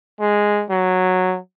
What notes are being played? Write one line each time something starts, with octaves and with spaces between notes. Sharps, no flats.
G#3
F#3